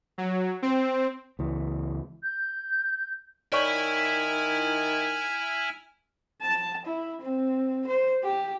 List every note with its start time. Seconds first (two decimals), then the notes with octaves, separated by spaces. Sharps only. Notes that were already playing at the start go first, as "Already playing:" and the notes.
0.18 F#3
0.62 C4
1.39 C#2 E3
2.23 G6
3.53 D#3 E4 C#5 D5 G#5 B5 C#6 F6
6.42 A5
6.85 E4
7.21 C4
7.87 C5
8.23 G4